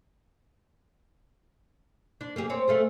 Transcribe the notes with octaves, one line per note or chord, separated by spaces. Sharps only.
D4
A#3 G4 G#4
C4 C#5
A3 F4 G#4